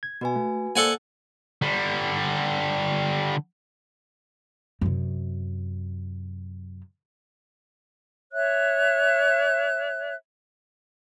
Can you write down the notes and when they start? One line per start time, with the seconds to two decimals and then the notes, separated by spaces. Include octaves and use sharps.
0.03 G#6
0.21 B2 F#4 B4 G#5
0.36 A3
0.76 A#3 A4 C5 D5 F#5 G#5
1.62 D3 G3
4.81 F#2 C3
8.32 C#5 E5 F#6